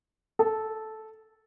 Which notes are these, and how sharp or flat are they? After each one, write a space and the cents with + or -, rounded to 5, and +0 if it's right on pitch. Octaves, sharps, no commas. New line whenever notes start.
A4 -10